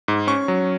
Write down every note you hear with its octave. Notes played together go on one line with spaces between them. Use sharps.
G#2
C#4 C#6
F#3